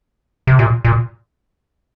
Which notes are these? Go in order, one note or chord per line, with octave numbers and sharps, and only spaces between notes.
C3
A#2
A#2